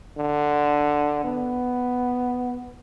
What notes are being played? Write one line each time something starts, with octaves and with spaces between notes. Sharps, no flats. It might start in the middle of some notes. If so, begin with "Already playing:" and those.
D3
B3